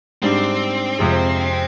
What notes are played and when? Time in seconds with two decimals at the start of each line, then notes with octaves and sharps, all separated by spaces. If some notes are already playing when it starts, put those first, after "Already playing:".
0.22 G#2 G3 C4 D4
0.99 F2 C3 F3 G#3